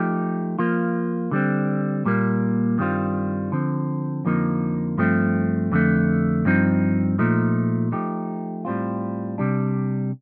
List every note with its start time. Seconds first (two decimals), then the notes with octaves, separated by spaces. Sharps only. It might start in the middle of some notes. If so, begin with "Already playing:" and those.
Already playing: F3 A3 D#4 G4
0.59 F3 A#3 F4
1.31 D3 G3 C4
2.05 A#2 G3 A#3
2.78 G2 D#3 G3 C4 F4
3.52 D3 F3 C4
4.25 F2 D3 F3 A#3 D#4
4.98 G2 F3 A3 C4
5.72 F2 D3 A3
6.45 G2 F3 C4 D#4
7.19 A#2 F3 A3 D#4
7.92 F3 A3 D#4 G4
8.65 A2 G3 C4 F4
9.38 C3 G3 D4